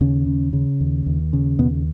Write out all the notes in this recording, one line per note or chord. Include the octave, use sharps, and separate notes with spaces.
D#2 C#3 C#4
C#3
C#3
D#2
D#2
C#3
D#2 B2 B3